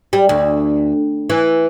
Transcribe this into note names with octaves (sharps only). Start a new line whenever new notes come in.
G3
D2
E3